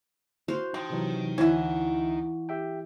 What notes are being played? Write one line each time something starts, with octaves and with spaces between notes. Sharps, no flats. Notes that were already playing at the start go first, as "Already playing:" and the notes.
F#4 C5 F5
F3 D#4 G5
C3 E3 F#3
D2 E3 C#4 F#4 E5
G4 E5 G5